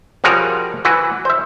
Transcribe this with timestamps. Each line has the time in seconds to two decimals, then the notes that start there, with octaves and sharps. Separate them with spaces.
0.24 F3 G3 F#4 G#4 A#4 C#5
0.85 E3 E4 F#4 B4
1.25 C5 E5